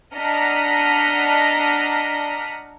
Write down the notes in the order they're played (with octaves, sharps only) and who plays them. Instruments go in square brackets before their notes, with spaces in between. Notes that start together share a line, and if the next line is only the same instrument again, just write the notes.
[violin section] D4 D#5 F#5 A#5 F6 B6